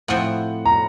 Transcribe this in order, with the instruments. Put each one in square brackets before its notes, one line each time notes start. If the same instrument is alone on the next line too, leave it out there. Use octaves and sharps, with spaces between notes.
[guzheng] A2 F3 C4 [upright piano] F#5
[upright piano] A#5